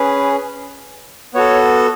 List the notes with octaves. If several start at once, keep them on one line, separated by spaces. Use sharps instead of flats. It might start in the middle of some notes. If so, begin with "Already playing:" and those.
Already playing: C#4 G#4 B4
B3 F#4 A4 C#5